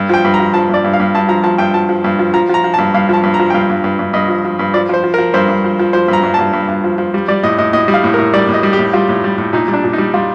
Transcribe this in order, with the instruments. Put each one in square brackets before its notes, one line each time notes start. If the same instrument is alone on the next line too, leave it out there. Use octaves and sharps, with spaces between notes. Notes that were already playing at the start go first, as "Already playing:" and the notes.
Already playing: [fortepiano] G2
F3 G5
G2
A#5
F3
F3 A5
G2 D5
G2
F5
G2
G2 A5
F3 A#5
F3 A5
G2 G5
F3 A5
F3
G2
F3
F3 A#5
F3 A#5
F3
A5
G2
G2 F5
F3 A5
G2
A#5
F3
G5
G2 F5
G2
G2
G2
G2 D#5
F3
F3
G2
F3 D5
F3 C5
F3
A#4
F3
G2 C5
G2
F3
F3
F3 C5
G2
A#5
G2
G2 A5
G2
G2
F3
F3
G3
G3 D5
A2 D#5
A2 D#5
A2 D#5
G3
F5
A2
A#4
A2
G3 D5
A2
D#5
G3
G4
A2
G3 F4
A2
G3
A2
A#2 D#4
G3
D4
A#2
D#4
G3
G3 F4